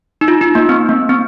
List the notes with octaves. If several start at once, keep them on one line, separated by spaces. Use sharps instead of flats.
D#4
F4
D#4
A#3
C4
A#3
C4